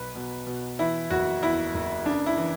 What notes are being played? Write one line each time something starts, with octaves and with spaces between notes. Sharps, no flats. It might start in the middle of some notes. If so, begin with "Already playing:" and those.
Already playing: B1 B2 B4
B2
B2
E3 E4
F#1 F#4
E2 E4
F#1
C#3 D4
E4
E3